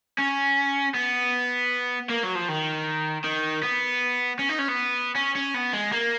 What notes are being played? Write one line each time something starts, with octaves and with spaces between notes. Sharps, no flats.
C#4
B3
A#3
F#3
F3
D#3
D#3
B3
C#4
D#4
C#4
B3
C#4
C#4
B3
G#3
A#3